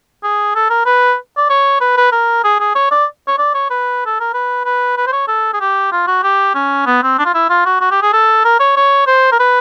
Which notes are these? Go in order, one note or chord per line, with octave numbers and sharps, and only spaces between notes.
G#4
A4
A#4
B4
D5
C#5
B4
B4
A#4
G#4
G#4
C#5
D5
C#5
D5
C#5
B4
A4
A#4
B4
B4
B4
C5
C#5
A4
G#4
G4
F4
F#4
G4
C#4
B3
C4
D4
F4
E4
F4
F#4
F#4
G4
G#4
A4
A#4
C#5
C#5
C5
A#4
B4